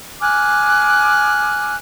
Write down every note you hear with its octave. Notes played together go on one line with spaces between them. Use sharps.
G#5 D6 F6 F#6